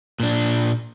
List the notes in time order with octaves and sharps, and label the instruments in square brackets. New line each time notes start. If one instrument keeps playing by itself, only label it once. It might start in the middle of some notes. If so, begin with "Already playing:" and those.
[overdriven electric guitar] A#2 D4